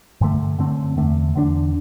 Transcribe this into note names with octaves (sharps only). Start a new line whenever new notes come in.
G2 D3 A3
F#2 D3 A3 C4
E2 D3 A3
E2 D3 A3 D4